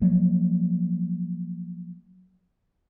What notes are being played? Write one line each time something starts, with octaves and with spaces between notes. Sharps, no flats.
F3 F#3 A#3